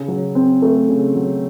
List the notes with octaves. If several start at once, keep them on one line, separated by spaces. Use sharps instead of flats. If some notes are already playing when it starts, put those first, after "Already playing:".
Already playing: C#3
F#3
C4
A3
C#3
F#3